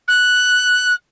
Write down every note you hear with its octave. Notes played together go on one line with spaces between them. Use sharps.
F#6